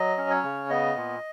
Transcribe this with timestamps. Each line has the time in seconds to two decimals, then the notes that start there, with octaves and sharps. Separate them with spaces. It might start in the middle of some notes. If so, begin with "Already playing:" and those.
Already playing: F#3 D#5
0.18 C#4
0.30 C#5
0.44 C#3
0.70 B3 D#5
0.96 A#2